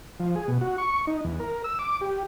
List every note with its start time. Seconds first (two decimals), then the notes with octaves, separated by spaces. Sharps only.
0.20 F3
0.36 G#4
0.48 B2
0.61 F#4
0.78 C#6
1.07 D#4
1.25 E2
1.40 A#4
1.64 E6
1.79 D6
2.01 G4